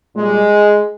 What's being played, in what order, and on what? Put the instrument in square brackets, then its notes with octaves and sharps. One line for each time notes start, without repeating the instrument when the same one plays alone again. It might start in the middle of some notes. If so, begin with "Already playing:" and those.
[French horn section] A#2 G3 G#3